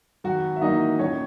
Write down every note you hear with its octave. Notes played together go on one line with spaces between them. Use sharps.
G#1 F#3 F#4
E5
F#2 E3 A#3 D#4 D#5
A#1 C#4 C#5